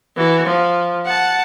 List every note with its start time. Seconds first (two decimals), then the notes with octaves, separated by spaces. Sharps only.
0.16 E3 F#4
0.46 F3
1.05 F#5 A5